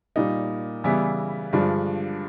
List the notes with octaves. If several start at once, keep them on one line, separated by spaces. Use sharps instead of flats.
A#2 G3 A#3 D#4
C#3 E3 G3 B3 E4
G2 D3 F3 G#3